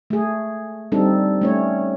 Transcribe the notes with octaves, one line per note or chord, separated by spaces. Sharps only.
A3 G#4
G3 C4 D4 D#4 A4
A3 C#4 C#5